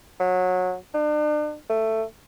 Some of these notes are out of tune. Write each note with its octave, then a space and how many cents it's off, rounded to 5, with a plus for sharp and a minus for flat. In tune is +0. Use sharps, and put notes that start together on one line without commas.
F#3 -20
D4 +40
A3 +10